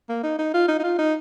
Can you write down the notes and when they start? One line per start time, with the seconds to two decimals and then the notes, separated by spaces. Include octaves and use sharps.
0.09 A#3
0.23 D#4
0.39 D#4
0.54 F4
0.68 D#4
0.79 D#4
0.83 F4
0.99 D#4